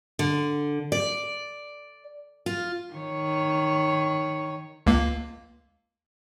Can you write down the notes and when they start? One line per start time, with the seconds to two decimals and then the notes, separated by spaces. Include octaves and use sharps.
0.19 D3
0.92 D5
2.46 F4
2.93 D#3 C#5
4.87 C#2 A#3